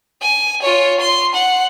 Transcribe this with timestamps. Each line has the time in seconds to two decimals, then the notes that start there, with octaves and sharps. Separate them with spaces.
0.22 G#5
0.62 F4 C#5
1.00 C6
1.34 F#5